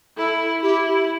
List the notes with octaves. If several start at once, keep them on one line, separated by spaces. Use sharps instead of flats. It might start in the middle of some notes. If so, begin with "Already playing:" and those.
E4 A4
E4 G4